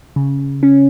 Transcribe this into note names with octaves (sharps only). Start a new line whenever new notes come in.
C#3
C#4